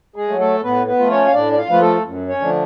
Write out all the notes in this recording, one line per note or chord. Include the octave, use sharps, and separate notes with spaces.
G#3 G#4
F#3 A3
A3 A4
A2 B3 B4
B3 B4
F3 A3 F4
C#4 C#5
F5
A2 D4 D5
D5
F4 F5
F3 A3 F4 B4
A3 A4
F#2
C#4 C#5
D3 F3 A3 D4